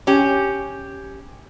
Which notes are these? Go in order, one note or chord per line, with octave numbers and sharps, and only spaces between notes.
C#4 G4